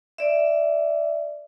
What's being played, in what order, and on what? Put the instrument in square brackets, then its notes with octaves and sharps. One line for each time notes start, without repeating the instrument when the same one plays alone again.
[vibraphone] D5 E5